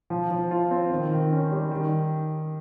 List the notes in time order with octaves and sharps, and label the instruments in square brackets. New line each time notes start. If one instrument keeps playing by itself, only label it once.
[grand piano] F3
F3
F4
C4
D#3
D#3
C#4
G3
D#3